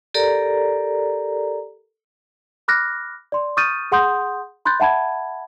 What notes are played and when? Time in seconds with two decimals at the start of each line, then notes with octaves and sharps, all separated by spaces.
0.14 G4 A4 A#4 D5 A#5
2.68 B5 D6 F6 F#6 A#6
3.32 D5 C6
3.57 C#6 D#6 F6 G6 A6 D#7
3.92 G#4 F#5 C6 D#6 G6
4.65 B5 C6 F#6 G6 A6
4.80 E5 F#5 A5 B5 G#6